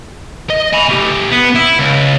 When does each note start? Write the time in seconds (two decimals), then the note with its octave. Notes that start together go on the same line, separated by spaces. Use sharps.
0.50 D#5
0.73 G#5 B5
0.89 A3 G4
1.31 B3
1.55 E4
1.79 C#2